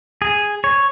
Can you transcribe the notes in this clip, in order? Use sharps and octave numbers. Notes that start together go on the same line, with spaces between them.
G#4
C#5